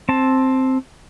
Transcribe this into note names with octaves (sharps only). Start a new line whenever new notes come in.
C4 A5